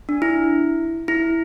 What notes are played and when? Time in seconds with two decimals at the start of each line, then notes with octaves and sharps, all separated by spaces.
0.09 D4
0.22 E4
1.08 E4